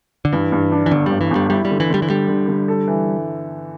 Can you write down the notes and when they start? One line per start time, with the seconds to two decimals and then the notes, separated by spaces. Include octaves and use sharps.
0.25 D3
0.33 G2 E3
0.52 G2
0.72 D4
0.86 E3
0.91 G1 D3
1.06 G2 G3
1.21 E3
1.31 G1 G3
1.50 G3 E4
1.65 G3
1.71 D3
1.80 E3
1.90 D3 G3
2.02 E3
2.09 D3 G3
2.28 D3
2.48 D3
2.68 A4
2.88 E3